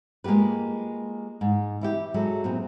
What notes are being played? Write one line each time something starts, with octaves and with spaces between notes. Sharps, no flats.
G#3 A#3 F4 G4 B4
G#2
E3 E4 G4
F#3 G#3 E4 A4
A#2 B3 C4